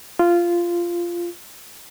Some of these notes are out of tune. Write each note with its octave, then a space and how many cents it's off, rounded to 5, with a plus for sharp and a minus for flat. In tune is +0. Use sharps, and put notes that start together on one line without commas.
F4 -10